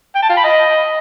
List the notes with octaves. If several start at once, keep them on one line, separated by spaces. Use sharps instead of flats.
G5
A5
F4
B5
D#5